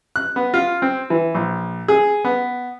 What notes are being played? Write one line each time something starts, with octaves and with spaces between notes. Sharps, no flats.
F#6
B3
F4
C4
E3
A#1
G#4
B3